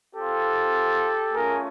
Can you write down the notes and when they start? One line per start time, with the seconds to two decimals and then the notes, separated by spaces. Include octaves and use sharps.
0.15 C4 F4 G4 A4
1.33 A3 C#4 F4 G#4 A#4